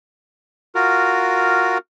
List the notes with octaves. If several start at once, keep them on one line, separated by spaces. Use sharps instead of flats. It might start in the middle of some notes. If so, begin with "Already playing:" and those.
F4 F#4 A#4